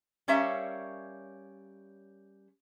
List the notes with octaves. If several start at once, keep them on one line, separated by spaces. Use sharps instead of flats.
G3 C#4 A#4 C#5 E5 F5